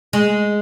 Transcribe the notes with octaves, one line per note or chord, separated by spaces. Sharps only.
G#3